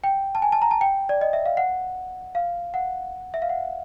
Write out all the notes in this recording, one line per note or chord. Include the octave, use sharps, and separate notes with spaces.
G5
A5
G#5
A5
A#5
A5
G5
D5
D#5
E5
F5
F#5
F5
F#5
E5
F5
F#5